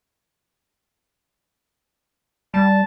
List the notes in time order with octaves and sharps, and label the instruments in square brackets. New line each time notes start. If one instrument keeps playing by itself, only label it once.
[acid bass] G3 [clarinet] A5